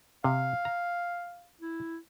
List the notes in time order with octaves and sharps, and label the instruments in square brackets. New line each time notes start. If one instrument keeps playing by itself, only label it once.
[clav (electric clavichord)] C3 [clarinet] F5
[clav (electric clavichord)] A#5
[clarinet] E4